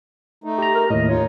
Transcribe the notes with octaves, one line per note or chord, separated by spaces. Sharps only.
A3 D#4
G4 A#5
A#4
D#2 A2 D#5
D#4 F4 C#5